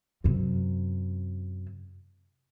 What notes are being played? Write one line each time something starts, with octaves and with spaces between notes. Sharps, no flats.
F#2 C3